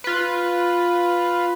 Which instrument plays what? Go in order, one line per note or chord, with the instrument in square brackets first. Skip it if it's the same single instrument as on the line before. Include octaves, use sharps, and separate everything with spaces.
[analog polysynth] F4 B4